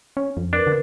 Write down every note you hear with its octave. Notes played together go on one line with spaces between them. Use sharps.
C#4
F2
D4 A#4 B4
D3